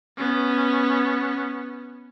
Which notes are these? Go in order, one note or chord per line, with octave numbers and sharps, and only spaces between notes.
B3 C#4